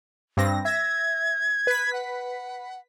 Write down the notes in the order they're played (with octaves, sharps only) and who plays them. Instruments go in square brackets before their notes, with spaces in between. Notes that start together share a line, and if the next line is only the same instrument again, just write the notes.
[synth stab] G2 C4 A#6
[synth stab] E5 A#6 [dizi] G#6
[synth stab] B4 B6
[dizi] F#5